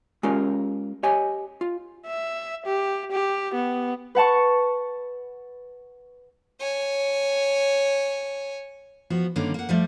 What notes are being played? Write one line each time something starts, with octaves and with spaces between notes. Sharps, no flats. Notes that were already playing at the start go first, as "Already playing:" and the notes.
G#3 C#4 F4 G4 A#4
G4 C#5 D#5 G#5
F4
E5
G4
G4
B3
B4 F#5 A5 C#6
C#5 G#5
F3 B3 F#4
G2 D3 D#3 A#3 C#4
A#3 F#5
F3 G3 A3